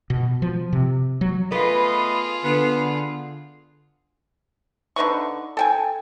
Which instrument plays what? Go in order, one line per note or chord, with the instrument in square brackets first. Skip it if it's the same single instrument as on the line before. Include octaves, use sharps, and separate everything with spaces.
[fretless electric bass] B2
F3
C3
F#3
[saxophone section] A3 B3 D#5 [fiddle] F4 G#4 [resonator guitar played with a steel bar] B4
[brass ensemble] D3 [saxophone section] B3
[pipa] D3 D#4 B4 C#6
A4 G5 G#5